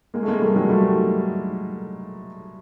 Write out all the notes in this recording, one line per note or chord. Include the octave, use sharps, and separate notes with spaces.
G#3 A#3
A3
G#3 A#3
G3 A3
F#3 G#3
G3 A3